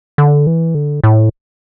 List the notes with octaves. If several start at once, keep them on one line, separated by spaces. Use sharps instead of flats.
D3
E3
D3
A2